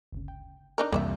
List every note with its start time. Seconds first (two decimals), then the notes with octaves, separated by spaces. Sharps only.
0.12 G1 D2 C#3
0.28 G5
0.78 D4 D#4 A#4
0.92 C2 F2 E3 G3 A#3 C5 E5